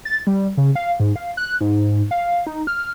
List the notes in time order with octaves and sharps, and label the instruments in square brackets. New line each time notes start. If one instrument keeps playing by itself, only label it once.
[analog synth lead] A6
G3
C#3
F5
G#2
F5
F#6
G#2
F5
D#4
F6